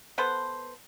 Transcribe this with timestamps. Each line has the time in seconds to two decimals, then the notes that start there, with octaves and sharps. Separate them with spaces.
0.18 B3 A4 B4 C5